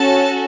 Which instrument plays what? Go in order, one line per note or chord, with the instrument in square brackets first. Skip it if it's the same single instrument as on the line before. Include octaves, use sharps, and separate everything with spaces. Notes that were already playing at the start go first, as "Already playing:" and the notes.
Already playing: [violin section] C#4 F#4 A4 A5